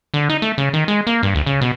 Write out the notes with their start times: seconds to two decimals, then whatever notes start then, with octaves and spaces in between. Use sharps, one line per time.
0.14 D3
0.30 D#4
0.42 A3
0.58 C#3
0.73 D#3
0.88 G#3
1.07 A#3
1.23 G2
1.35 D2
1.46 C#3
1.61 B2